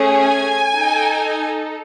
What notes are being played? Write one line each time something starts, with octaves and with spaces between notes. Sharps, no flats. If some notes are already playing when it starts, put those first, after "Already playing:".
Already playing: A3 C#4 G#4
G#5
D#4 A4